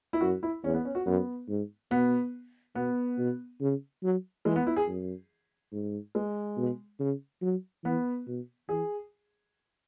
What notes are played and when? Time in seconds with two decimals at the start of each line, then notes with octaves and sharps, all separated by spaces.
0.13 E4
0.21 F#2 F#4
0.43 E4
0.64 E2 C#4
0.74 B3
0.85 C#4
0.95 F#4
1.06 F#2 B3
1.49 G#2
1.91 B2 B3
2.75 B2 B3
3.18 B2
3.61 C#3
4.03 F#3
4.45 E3 G#3
4.56 B3
4.67 E4
4.76 G#4
4.87 F#2
5.72 G#2
6.15 G#3
6.57 B2
7.00 C#3
7.42 F#3
7.84 E3 B3
8.27 B2
8.69 E3 G#4